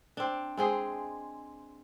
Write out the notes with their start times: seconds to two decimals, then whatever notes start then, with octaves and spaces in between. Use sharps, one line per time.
0.17 C4 D4
0.57 G#3 C4 G#4